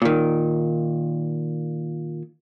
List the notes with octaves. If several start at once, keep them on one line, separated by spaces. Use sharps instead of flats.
A#2 D#3